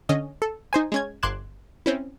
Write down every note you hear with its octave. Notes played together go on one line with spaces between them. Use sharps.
D3 C#4 D#5
A4
D#4 C5 G#5
G#3 C#4 G#6
G1 C6 D6 F#6 G#6 E7
C4 C#4 E4